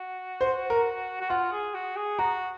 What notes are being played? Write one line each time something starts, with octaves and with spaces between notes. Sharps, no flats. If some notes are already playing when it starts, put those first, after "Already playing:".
Already playing: F#4
C5
A#4
F#4
F4 F#5
G#4
F#4
G#4
F#4 A#5